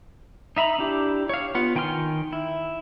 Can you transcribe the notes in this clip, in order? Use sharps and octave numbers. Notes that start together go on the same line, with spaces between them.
D#4 E5 A#5 B5
D4 E4 G4
C#5 F5
B3 F4 F#5
D#3 G5 G#5 C6 F6
E4